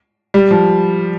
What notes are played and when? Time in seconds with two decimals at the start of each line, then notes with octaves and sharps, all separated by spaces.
0.34 G3
0.51 F3